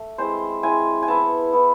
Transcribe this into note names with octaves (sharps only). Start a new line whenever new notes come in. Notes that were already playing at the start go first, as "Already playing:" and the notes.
Already playing: A3
G#3 C4 E4 C5
G#3 C4 E4 G#5
G#5
B3 E4 A5
B3 E4